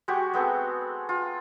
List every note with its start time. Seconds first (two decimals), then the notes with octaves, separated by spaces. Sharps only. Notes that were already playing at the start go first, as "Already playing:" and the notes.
0.08 G#3 F#4 G4 C#6
0.34 G#3 B3 C4 A4
1.09 F4